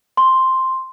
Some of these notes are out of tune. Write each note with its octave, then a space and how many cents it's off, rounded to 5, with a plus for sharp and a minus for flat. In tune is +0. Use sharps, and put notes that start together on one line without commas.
C6 +0